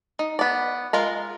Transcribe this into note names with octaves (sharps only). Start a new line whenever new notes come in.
D#4
B3 D5
G#3 F4 A#4